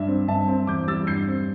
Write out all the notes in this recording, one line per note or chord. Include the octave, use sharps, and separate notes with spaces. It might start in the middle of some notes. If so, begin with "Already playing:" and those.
Already playing: G2 D4 E5
C4
G2 E5 A5
C4
E2 D6 G6
G3 E6 A6
G2 G6 C7
C4